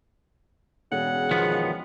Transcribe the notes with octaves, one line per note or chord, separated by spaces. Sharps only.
E1 C#3 F#5
D#3 F3 B3